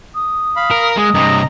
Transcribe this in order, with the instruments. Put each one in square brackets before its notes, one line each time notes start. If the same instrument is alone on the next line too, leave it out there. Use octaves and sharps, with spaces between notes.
[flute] D#6
[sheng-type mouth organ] F5 B5
[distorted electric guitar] A#4
[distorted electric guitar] G#3 [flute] D#6
[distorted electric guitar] G2 C3 [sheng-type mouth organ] D#5 A#5